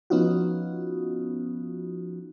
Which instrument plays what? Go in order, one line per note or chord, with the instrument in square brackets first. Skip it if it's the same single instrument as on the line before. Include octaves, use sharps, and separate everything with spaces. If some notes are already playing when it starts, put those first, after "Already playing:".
[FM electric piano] F3 B3 C#4 D#4 F4 F#4